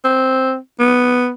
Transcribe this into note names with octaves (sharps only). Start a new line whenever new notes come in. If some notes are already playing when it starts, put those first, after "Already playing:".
C4
B3